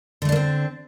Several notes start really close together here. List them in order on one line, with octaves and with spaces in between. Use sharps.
D3 A3 D4 A#3 C4